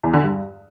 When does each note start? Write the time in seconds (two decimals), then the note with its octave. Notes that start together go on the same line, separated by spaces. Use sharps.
0.03 E2
0.13 D3
0.23 G2